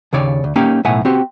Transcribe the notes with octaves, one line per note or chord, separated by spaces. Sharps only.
D#2 C#3 C#5 D5
D2
A#3 C#4 D#4 G4
B1 A2 E5 F#5 G#5
C4 F#4 G4